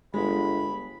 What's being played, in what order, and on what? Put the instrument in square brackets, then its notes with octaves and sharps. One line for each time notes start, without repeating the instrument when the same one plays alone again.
[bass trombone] G1 [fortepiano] G#3 [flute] B5